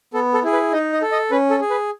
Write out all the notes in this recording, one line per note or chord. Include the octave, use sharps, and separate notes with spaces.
B3 A4
A4
E4 G#4
B4
D#4 D#5
D#5
A4
D#5
C#4 B4
A4
G#4
B4